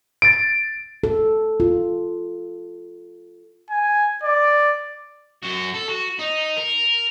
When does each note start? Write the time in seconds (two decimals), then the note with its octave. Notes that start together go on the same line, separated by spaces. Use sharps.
0.22 A6 D7
1.03 A4
1.60 F4
3.70 G#5
4.23 D5
5.43 F#2 F#4
5.74 A4
5.89 F#4
6.19 D#4
6.57 A#4